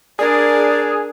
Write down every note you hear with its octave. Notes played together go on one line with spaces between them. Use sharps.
D4 G#4 A#4 D5